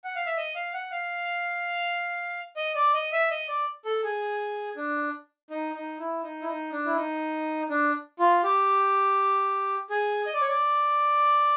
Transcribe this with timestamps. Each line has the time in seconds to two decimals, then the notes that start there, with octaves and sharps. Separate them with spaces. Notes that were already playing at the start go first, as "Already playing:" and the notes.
0.04 F#5
0.16 F5
0.26 E5
0.37 D#5
0.55 F5
0.74 F#5
0.92 F5
2.56 D#5
2.75 D5
2.94 D#5
3.12 E5
3.31 D#5
3.48 D5
3.85 A4
4.03 G#4
4.76 D4
5.50 D#4
5.75 D#4
5.99 E4
6.23 D#4
6.42 E4
6.48 D#4
6.72 D4
6.85 E4
6.96 D#4
7.70 D4
8.19 F4
8.43 G4
9.90 G#4
10.26 D#5
10.34 D5
10.41 C#5
10.49 D5